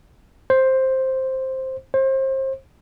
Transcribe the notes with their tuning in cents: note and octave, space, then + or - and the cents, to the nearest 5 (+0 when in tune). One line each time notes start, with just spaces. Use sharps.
C5 +5
C5 +30